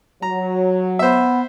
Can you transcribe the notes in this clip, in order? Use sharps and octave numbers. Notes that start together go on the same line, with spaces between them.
F#3 A#5
B3 C5 E5